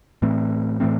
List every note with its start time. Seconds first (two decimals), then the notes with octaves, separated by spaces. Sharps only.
0.22 A2 E3 A3 C4
0.80 A2 E3 A3 C4